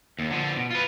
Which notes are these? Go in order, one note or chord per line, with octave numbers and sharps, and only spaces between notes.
D#2
D3 F3
B2
F4 B4